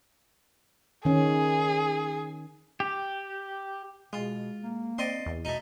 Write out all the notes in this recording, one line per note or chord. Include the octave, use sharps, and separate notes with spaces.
D#3 C#4 G#4
G4
B2 G#3 F4
A#3
C4 D5 D#5 C6
E2
B2 A3 D#4